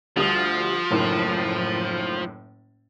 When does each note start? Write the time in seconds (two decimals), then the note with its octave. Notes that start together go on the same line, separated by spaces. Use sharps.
0.17 D2 F3 G3 D#6
0.91 F#1 A2 D#3